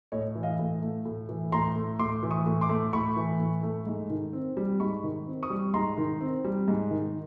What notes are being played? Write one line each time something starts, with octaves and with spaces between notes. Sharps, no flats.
A2 C#5 D#5
E3
D#5 F5
A2
A3
A2
E3
A2 A#5 C6
A3
A2 C6 D6
E3
C#6 D#6
A2
C6 D6
A3
A2 B5 C#6
E3
A2
A3
G#2
D#3
C4
G3
G#2 B5 C#6
D#3
C4
C#6 D#6
G3
G#2 A#5 C6
D#3
C4
G3
G#2
D#3